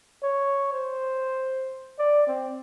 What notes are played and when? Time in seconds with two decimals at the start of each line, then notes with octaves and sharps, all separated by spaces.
0.23 C#5
0.72 C5
1.99 D5
2.27 C4